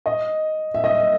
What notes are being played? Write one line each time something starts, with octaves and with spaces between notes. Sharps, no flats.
D#5
E5
D#5
E5